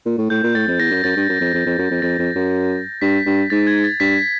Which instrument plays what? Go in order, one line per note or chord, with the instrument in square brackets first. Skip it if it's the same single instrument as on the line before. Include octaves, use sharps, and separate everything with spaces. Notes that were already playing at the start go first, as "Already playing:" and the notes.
[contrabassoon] A#2
A2
[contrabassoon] A2 [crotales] G6
[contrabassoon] A#2
[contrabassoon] A2 [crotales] A6
[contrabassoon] F2
[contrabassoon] E2 [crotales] A#6
[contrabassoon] F#2
[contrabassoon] F#2 [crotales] A6
[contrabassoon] G2
F#2
F2
F2
F2
F#2
F2
[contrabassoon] F2 [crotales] A6
[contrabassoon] F2
F#2
[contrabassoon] G2 [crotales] B6
[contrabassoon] G2
[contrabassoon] G#2 [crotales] A6
[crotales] G#6
A6
[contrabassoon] G2 [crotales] B6